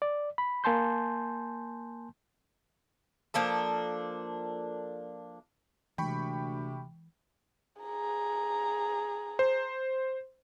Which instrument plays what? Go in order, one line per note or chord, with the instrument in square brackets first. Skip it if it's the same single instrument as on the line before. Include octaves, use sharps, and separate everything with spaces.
[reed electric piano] D5
B5
A#3 G#5 A5 C6 G6
[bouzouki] F3 A#3 D4 A4
[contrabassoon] D2 [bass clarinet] C3 [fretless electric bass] E3 G#3 [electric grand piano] G5 B5 C#6
[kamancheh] G#4 A#5
[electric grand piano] C5